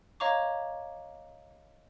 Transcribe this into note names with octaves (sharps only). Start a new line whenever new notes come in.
C#5 D#5 F5 A#5 C#6 D6